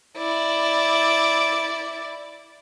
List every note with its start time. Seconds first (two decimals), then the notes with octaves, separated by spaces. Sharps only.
0.17 E4 D5